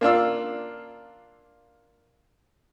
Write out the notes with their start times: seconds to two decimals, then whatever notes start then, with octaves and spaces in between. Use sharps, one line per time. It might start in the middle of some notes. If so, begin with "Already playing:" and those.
0.01 A#3 D4 F4 E6